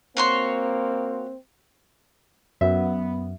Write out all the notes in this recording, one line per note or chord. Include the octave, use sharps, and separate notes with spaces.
A#3 C4 F#4 C#5 C6
F#2 B3 E5